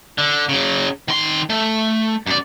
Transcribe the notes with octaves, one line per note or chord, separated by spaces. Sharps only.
D3
C#3 F#3
D#3 C6
A3
F#2 D5